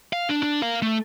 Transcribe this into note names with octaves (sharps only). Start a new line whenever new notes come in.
F5
D4
D4
A#4 F5
A3